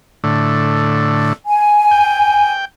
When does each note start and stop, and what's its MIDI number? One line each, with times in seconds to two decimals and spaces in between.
0.24 1.33 45
0.24 1.33 50
1.47 2.51 80
1.91 2.65 79